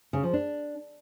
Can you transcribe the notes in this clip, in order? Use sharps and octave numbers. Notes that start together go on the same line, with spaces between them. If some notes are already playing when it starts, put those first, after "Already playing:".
C#3
F3
D4